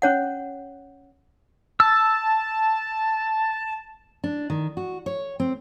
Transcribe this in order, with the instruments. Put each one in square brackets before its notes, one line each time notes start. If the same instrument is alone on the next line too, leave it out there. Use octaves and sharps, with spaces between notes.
[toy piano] C#4 C#5 F#5
[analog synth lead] A5 [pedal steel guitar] E6
[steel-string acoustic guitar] D4
D#3
F#4
C#5
C4